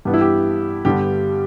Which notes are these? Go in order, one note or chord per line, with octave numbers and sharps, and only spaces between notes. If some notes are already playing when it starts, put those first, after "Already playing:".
G2 E3 B3 D4 G4
E4
G4
G2 D3 G3 B3 G4